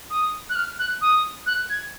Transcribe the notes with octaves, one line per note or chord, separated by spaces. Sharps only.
D#6
F#6
F6
F#6
D#6
F#6
G#6